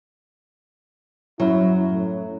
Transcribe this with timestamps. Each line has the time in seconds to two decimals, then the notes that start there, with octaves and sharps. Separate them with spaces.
1.40 F#2 F#3 E4
1.89 A2